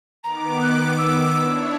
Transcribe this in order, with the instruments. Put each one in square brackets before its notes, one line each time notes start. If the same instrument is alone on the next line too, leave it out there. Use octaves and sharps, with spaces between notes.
[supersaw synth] D#3 B3 D6 [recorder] A#5
[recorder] F#6
E6
[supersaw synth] D4 E4 C#5